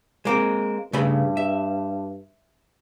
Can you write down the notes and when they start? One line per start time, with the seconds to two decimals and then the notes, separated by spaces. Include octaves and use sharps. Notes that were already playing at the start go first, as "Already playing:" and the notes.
0.25 G#3 A#3 C4
0.93 G2 C#3 A3 B5
1.37 E5